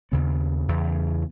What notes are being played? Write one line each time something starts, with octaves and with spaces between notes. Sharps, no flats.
D#2 C#3 B3
E2 C#3